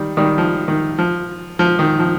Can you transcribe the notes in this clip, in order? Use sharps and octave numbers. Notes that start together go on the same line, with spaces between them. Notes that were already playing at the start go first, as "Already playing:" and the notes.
Already playing: D#3 G3
D#3 G3
F3
D#3
F3
F3
D#3
F3